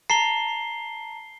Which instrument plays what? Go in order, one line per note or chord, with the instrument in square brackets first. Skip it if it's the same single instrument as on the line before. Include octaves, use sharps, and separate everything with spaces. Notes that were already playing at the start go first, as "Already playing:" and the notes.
[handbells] A5 A#5 [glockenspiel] C7 G7